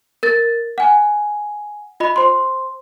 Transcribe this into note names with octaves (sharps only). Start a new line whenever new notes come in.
A#4 A6
F#5 G#5
F4 D#5 B5
C5 C6